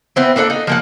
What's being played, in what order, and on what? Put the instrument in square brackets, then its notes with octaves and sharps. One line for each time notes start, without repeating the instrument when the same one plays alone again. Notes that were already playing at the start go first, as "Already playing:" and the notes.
[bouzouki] B3 C4 E4
A#3 D4 A4 F#5
D#4
F3 A#3 F#5